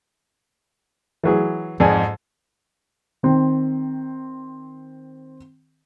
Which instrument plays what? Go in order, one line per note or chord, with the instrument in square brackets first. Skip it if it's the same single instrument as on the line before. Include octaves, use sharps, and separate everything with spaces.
[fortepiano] E3 F#3 G#4
[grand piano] F2 G#2 [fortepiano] G#4 D5 G#5
[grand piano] D#3 C4